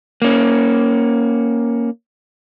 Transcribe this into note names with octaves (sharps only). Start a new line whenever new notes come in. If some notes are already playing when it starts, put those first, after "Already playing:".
A#3 C#4